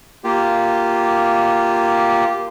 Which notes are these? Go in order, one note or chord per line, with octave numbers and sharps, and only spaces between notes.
A#3 F4 G4